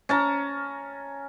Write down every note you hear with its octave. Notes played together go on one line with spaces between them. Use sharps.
C#4 A5 A#5